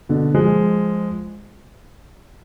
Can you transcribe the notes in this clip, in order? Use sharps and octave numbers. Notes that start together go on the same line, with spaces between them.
B2 D3
F3 G#3